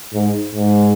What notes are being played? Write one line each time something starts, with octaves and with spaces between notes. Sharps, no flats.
G#2
G#2